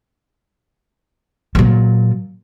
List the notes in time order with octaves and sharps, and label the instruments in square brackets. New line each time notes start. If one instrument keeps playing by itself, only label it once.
[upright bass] A#2 F#3